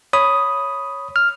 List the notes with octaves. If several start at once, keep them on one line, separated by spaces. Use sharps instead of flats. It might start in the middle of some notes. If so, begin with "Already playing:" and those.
C#5 B5 D#6
F6